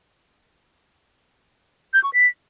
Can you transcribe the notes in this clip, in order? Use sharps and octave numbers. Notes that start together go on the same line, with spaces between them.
G6
C#6
B6